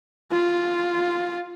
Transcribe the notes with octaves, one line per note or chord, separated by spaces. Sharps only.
F4